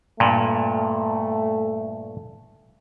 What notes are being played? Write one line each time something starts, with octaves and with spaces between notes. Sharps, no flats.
G2 A#2 A3